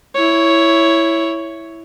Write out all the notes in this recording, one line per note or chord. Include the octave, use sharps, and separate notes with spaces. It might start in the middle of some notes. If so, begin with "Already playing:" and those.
E4 C#5